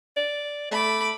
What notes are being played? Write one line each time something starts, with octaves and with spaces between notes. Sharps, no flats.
D5
A3 B5 D6